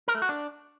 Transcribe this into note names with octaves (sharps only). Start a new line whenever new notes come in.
A#4
A3
F#4
D4